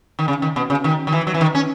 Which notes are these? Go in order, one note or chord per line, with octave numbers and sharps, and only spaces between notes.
D#3
C#3
D#3
B2
C#3
D#3
D#3
E3
F#3
E3
D#3
C#4